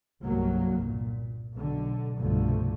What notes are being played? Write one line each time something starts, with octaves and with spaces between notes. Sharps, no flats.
G1 C2 F#3 A#3
A#2
B1 D3
C2 G2 B2 D3 F3 A3